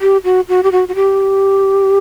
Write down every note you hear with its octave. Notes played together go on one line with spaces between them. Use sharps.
G4
F#4
F#4
G4
F#4
F#4
G4